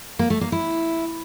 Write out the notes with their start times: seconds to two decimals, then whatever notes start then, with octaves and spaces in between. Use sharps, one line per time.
0.19 A#3
0.30 A3
0.41 A#3
0.52 E4